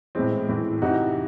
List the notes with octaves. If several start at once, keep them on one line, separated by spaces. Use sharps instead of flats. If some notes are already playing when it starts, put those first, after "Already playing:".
A2 E3 G#3 C4
A2 E3
C3 E3 D#4 F#4